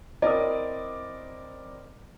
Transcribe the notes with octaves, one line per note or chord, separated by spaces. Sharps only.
C4 E4 A#4 D5 D#5 D#6